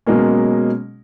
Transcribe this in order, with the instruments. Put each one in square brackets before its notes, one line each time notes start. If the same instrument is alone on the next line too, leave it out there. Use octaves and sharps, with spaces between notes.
[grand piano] B2 F#3 G#3 A#3 C#4